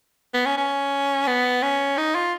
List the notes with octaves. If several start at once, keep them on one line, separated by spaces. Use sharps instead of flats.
B3
C#4
C#4
B3
C#4
D#4
F4